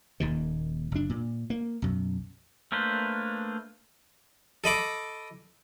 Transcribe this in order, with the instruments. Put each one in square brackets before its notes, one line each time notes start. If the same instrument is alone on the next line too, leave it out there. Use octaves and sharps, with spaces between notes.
[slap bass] D#1 A#2 D#3
F#1 D4
A#2
A#3
B1 F#2
[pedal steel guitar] A3 A#3 D4 B4 C5
[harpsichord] A4 D#5 B5 D6